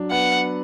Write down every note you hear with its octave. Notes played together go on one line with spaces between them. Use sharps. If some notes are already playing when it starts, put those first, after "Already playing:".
Already playing: F#3 D4
B3 F#5